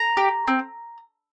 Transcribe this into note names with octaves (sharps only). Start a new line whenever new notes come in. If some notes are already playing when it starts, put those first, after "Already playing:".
Already playing: A#5
G4
C4